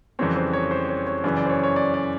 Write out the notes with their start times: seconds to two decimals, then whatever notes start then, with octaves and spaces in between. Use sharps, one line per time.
0.19 F2 C#3 E3 G3 C4 C#5
0.36 C5
0.53 C#5
0.71 C5
0.89 C#5
1.07 C#5
1.24 F#2 C#3 E3 D5
1.37 D5
1.45 C5
1.50 C#5
1.63 C#5
1.76 D5
1.94 D5